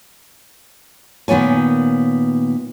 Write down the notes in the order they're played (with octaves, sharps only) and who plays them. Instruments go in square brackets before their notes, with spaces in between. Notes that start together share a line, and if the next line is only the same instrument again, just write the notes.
[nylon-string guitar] A#2 D#3 B3 F4 C#5 G#5